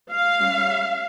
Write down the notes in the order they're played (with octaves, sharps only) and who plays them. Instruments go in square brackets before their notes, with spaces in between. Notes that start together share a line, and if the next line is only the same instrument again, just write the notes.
[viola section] F5
G3 C#4